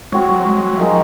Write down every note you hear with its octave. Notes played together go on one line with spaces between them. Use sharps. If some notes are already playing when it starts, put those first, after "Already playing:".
G#3 C4 F#4 C#5
F#3
G#3
F#3
F3 G#3 D#4 A#4 F5